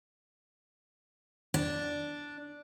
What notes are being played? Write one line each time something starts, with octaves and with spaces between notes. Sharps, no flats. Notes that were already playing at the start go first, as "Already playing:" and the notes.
D4